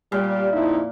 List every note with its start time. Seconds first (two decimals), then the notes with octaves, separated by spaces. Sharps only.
0.12 A#2 G3
0.53 F2 D#4 E4